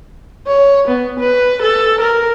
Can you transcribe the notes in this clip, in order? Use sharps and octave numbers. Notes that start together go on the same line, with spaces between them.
C#5
B3
B4
A4
A#4